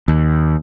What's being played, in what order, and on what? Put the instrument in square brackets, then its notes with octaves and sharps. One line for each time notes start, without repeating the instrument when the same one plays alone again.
[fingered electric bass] D#2